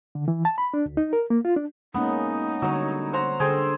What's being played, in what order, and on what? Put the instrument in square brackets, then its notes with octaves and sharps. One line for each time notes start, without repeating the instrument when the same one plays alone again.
[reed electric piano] D3
E3
A5
B5
D4
D2
D#4
A#4
A#3
F4
D4
[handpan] G#3 A#3 C#4 [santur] B3 [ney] D#4
[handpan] D3 G3 C#5 [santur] F#3
[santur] C5 F#5 A#5
[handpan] D3 [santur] G#4 C5 G5 [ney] A4